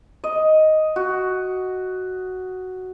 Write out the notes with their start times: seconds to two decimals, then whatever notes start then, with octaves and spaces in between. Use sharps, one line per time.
0.24 D#5
0.96 F#4